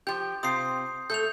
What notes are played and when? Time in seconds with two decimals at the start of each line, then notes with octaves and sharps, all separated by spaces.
0.07 F3 G4 G6
0.43 C3 C4 F4 D#6 C7
1.10 A3 A4 G6 F7